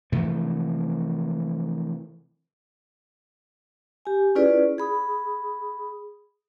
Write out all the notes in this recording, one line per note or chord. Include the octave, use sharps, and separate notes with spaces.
C3 E3 F3 A3
G4 G#5
C#4 E4 F4 G#4 B4 D5
G#4 B5 D#6